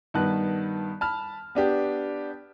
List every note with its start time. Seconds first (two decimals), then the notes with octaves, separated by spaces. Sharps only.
0.14 G2 D#3 B3 A5 F#6
1.01 A5 B5 F6
1.55 B3 D4 G4